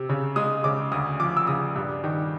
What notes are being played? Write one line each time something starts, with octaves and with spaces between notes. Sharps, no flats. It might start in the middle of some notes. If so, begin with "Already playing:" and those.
Already playing: C3
C#3
G#3 D#6
C#3 D6
D2 D#6
F3 D6
E6
C#3 D#6
G2
D#3